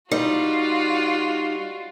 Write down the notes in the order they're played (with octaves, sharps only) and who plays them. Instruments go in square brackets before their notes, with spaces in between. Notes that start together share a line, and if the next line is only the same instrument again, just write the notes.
[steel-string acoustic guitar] G3 [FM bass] D#4 [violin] F4 F#4